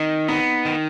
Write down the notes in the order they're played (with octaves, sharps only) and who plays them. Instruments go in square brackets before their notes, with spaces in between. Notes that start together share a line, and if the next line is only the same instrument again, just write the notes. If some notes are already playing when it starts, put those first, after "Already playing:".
Already playing: [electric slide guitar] D#3 [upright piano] D#4
[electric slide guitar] B3 [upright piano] D#4
[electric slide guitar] D#3